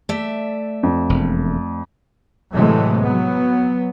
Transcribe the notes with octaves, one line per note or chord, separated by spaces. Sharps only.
A3 D5 E5
F2
E1
A2 C3 E3 F#3 G#3 A3
F#3 B3